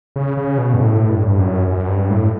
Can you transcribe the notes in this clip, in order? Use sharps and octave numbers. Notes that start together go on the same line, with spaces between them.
C#3
C#3
B2
G2
A2
G2
G2
F#2
F#2
G2
A2